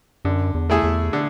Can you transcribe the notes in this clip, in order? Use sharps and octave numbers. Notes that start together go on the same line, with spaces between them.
F#2 D3
E2
A3 E4 G#4
E2
D3